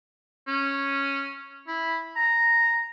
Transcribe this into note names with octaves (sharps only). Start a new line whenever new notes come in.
C#4
E4
A#5